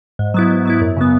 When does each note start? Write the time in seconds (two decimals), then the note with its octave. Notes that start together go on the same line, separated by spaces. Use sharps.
0.19 G#2
0.34 F#3 B3 E4
0.50 G#2
0.65 F#3 B3 E4
0.81 F#2
0.97 C#3 F#3 B3